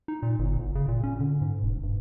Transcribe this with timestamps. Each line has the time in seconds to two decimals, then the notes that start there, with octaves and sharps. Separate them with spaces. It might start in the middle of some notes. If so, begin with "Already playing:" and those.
0.08 D#4
0.22 A#2
0.39 G1
0.58 G1
0.75 C#3
0.88 A#2
1.03 C#4
1.20 D3
1.41 G#2
1.63 E1
1.83 G2